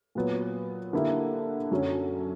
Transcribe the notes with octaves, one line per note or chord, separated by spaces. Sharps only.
A#2 F#3 B3
D3 A#3 E4 G4
F#2 D3 F#3 C#4